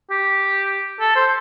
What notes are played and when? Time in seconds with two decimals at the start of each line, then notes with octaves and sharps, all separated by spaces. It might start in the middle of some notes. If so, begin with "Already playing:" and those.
0.11 G4
1.00 A4
1.16 C5